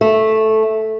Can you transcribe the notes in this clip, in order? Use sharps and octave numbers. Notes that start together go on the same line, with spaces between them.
A3